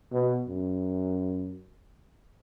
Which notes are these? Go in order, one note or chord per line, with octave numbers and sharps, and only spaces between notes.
B2
F#2